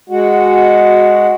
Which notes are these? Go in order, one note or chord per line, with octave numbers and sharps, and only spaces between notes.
G#3 F#4